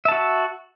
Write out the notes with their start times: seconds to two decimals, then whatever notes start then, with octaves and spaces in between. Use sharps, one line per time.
0.05 E5
0.08 A5
0.12 F#4